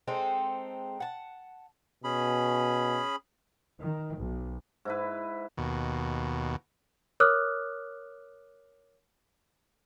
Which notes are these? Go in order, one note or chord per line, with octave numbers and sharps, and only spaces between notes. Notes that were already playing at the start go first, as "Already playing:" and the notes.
G#3 C4 D#4 A4
F#5 A5
B2 C#4 G#4 B5
D#3
B1
G#2 E4 B4
D#2 B2
A#4 C#5 D6 D#6 F6 F#6